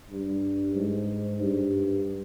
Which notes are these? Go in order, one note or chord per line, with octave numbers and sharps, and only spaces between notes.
G2
G#2
G2